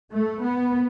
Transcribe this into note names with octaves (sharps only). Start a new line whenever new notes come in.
A3
B3